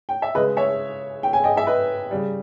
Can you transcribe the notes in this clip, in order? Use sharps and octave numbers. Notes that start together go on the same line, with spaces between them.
G5
E5
C#3 G#3 B4 D#5
C#5 E5
G5
G#5
D#5 G5
E5
B4 D#5
C#3 G3